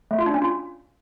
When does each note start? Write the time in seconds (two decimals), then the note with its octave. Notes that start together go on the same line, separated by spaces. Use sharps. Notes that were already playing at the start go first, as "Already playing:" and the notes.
0.11 A3
0.19 F4
0.26 D4
0.34 C#4
0.42 F4